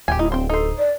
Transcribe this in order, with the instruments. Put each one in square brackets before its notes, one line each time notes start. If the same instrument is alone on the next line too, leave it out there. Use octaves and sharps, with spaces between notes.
[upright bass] D1 [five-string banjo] G4 G5 G#5
[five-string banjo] D#4 [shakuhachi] E4
[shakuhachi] C4 [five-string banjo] C5 G5
[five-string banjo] D#4 C5 [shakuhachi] A4
[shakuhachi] D5